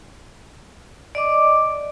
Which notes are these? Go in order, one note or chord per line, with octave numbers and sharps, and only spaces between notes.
D5 D#5 D6